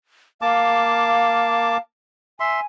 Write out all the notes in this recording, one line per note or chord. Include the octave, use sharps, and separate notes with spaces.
A#3 F5 A5 D6
E5 G#5 C6